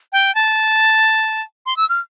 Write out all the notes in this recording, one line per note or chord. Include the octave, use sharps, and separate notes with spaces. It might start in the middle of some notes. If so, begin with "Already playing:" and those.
G5
A5
C6
E6
F6